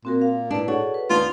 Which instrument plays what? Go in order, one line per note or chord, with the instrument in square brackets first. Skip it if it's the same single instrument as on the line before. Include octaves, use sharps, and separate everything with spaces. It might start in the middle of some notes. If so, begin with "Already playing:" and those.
[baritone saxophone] A#2 [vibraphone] C4 F#4 A#4
[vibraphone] F5
[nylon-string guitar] D4 [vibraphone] E4 B4
[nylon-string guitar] F#4 [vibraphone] G#4 A4 C#5
[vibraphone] B4
[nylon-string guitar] D#2 B3 D4 [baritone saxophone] F4